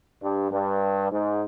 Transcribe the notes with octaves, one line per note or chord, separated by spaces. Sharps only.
G2
G2
G#2